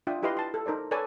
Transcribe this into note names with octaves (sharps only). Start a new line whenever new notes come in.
D4 F4 E5 G5 D#6
E4 G4 B4 D#5 F5 C6
A5 C6
A4
D#4 A#4 C5 D5
A4 B4 C#5 D5 G#5 A5